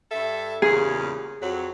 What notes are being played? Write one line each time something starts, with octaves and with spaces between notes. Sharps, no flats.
G2 A4 E5
E2 A#2 C#3 G#4
F2 F#3